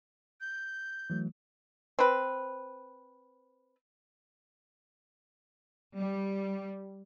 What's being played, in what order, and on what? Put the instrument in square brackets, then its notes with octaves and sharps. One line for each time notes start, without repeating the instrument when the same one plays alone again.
[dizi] G6
[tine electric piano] E3 F#3 A3
[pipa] C4 B4
[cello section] G3